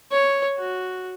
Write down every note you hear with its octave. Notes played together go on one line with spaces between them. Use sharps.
C#5
F#4